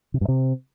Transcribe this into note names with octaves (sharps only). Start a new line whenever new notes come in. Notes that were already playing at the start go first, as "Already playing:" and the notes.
C3
G2
C3